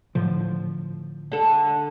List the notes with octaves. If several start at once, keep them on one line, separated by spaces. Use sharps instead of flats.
A2 D3 F3
D3 A4